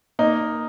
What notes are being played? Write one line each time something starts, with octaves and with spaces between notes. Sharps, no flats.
A#3 D#4